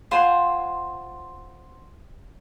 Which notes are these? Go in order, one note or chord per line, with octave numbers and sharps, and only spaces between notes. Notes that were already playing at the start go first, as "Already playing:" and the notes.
F4 C5 F#5 G#5